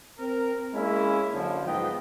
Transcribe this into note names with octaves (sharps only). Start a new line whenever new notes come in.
C4 A#4
G#3 A#3 C#4 E4
F#2 D3 F3
G#2 F3 B3 D#5 G5